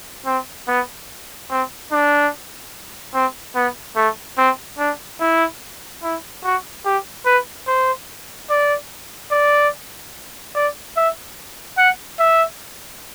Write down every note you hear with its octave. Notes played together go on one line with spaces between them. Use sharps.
C4
B3
C4
D4
C4
B3
A3
C4
D4
E4
E4
F#4
G4
B4
C5
D5
D5
D5
E5
F#5
E5